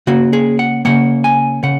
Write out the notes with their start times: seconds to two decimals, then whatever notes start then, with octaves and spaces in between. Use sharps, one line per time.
0.07 C#3 A#3 F#4
0.33 G#4
0.59 F#5
0.85 C#3 A#3 F#5
1.24 G#5
1.63 C#3 F#5